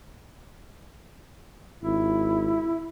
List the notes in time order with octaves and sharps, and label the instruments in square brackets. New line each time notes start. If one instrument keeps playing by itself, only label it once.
[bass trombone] G#1 [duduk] E4